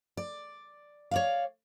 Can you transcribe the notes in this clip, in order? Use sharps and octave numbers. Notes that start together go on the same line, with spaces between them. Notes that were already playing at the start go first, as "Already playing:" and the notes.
D5
C#5 D5 F5